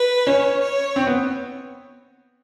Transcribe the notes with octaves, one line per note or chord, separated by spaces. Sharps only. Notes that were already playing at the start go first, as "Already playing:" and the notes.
Already playing: B4
C#4 C#5
C#5
C4
B3